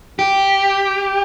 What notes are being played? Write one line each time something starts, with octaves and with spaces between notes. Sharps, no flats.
G4